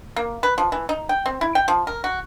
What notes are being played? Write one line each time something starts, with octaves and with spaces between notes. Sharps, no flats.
A#3
B4
F3
E3
D#4
G5
C4
E4
G5
F3
A#4
F#4